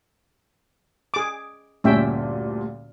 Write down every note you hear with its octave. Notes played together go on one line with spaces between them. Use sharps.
G#4 D6
D2 G2 A#2 C#4 E5 G5